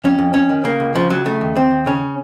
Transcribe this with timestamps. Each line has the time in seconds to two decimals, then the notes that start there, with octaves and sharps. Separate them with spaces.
0.04 F2 C#4
0.19 F2
0.34 F2 C#4
0.49 D#3
0.64 C#3 A#3
0.80 C#2
0.95 C#3 F3
1.10 C#2 F#3
1.25 C#3 A3
1.41 D#2
1.55 D#2 C4
1.71 D#2
1.86 C#3 C#4